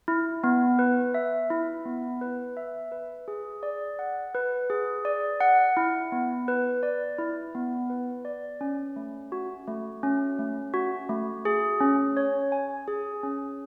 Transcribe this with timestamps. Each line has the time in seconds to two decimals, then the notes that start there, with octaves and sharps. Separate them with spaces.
0.08 E4
0.44 B3
0.79 B4
1.14 E5
1.50 E4
1.85 B3
2.21 B4
2.57 E5
2.92 B4
3.28 G#4
3.63 D5
3.99 F#5
4.35 B4
4.70 G#4
5.05 D5
5.41 F#5
5.77 E4
6.12 B3
6.48 B4
6.83 D5
7.18 E4
7.55 B3
7.90 B4
8.25 D5
8.61 C#4
8.96 A3
9.32 F#4
9.67 A3
10.03 C#4
10.39 A3
10.74 F#4
11.09 A3
11.45 G#4
11.81 C#4
12.17 C#5
12.52 G#5
12.88 G#4
13.23 C#4